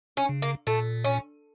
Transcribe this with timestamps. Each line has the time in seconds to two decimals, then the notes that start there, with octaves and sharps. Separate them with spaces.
0.17 C#4
0.29 C#3
0.42 A#3
0.67 A#2 A3
1.04 C#4